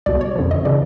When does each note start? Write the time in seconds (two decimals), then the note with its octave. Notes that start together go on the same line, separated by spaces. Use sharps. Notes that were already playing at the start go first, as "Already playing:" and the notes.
0.06 C2 B2 D5
0.21 C#5
0.36 F2 D3 F3
0.51 D#5
0.65 C#3 E3 D5